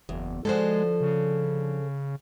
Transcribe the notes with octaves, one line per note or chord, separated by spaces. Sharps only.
F#1 E2
D3 F3 G#3 F#4 A4 C5
C#3